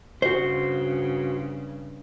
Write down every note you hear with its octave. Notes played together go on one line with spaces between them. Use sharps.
G2 C#3 F#4 C5